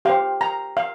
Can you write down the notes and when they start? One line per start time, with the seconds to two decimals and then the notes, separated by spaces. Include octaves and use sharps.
0.05 G4 C5 F5
0.41 A#5
0.77 F5